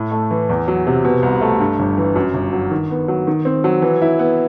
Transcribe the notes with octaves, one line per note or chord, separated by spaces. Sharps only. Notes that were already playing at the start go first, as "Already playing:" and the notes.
Already playing: A2
A3
E3
E2
F#3
C3
B2
C2
A3
G2
G1
E3
F#2
G1
F#3
D#3
B3
F#3
D#3
C4
F#3
E3
E4
B3